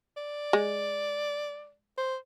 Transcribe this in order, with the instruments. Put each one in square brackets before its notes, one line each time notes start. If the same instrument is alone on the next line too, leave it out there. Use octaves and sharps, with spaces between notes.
[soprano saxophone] D5
[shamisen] G#3
[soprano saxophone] C5